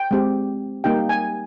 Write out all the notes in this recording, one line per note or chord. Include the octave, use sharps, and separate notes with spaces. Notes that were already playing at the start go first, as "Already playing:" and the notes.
Already playing: G5
G#3 C4 G4
G3 A#3 D#4 G4 G5
G#5